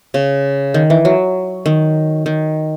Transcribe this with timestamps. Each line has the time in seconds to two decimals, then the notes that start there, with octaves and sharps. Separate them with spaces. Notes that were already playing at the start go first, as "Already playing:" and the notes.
0.14 C#3
0.74 D#3
0.90 E3
1.05 F#3
1.66 D#3
2.26 D#3